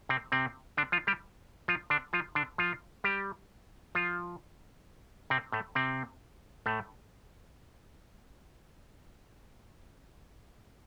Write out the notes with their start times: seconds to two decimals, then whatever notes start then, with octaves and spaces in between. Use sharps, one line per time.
0.09 C3 C4
0.32 C3 C4
0.77 D3 D4
0.92 F3 F4
1.07 G3 G4
1.68 F3 F4
1.90 D3 D4
2.13 F3 F4
2.35 D3 D4
2.58 F3 F4
3.04 G3 G4
3.95 F3 F4
5.30 C3 C4
5.52 A2 A3
5.75 C3 C4
6.66 A2 A3